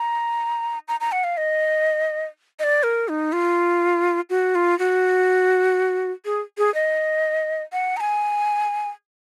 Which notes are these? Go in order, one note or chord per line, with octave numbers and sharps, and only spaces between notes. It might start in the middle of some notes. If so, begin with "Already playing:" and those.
Already playing: A#5
A#5
A#5
F#5
F5
D#5
D#5
D5
A#4
D#4
F4
F#4
F4
F#4
G#4
G#4
D#5
F#5
A#5
G#5